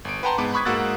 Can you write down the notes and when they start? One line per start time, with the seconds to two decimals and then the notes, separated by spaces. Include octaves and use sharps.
0.05 G1 D7
0.23 B4 F#5 G5 A5 A#5 C6
0.38 G#2 B3 B4 D6
0.54 B5 C#6 D#6 F#6 G#6 B6
0.65 G#2 A#3 F#4 E6 F#6 A6